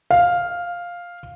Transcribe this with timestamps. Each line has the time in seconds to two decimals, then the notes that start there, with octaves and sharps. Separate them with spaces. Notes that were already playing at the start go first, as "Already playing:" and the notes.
0.11 F5